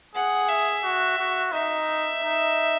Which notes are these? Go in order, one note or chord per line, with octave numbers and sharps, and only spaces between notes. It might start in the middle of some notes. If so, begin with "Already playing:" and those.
G#4 F#5
E5
F#4
F#4
D#4 E5
D#4